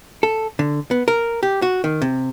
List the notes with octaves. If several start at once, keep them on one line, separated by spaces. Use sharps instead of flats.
A4
D3
B3
A#4
G4
F#4
D#3
C3